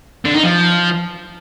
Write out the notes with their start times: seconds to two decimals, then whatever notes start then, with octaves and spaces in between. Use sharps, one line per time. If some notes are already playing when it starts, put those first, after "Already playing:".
0.25 D3
0.34 D#4
0.43 F3